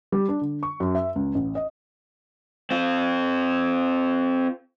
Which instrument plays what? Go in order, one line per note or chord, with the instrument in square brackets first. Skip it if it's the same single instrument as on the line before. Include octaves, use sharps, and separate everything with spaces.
[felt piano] G3
D4
D3
C#6
F#2
E5
C#2
A1
D#5
[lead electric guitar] C4 F4